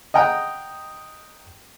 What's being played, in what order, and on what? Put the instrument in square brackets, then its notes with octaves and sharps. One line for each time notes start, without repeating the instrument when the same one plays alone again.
[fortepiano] D#5 F#5 G5 A#5 D#6